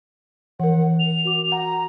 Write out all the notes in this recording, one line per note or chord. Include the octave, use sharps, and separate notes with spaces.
E3 A#4 F#5
F7
F#4 D6
F#5 A#5